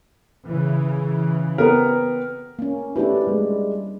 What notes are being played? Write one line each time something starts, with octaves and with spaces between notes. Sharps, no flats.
C#3 E3
B3 C4 A#4
A#3 C#4
A3 D4 E4 G4 B4
G3 G#3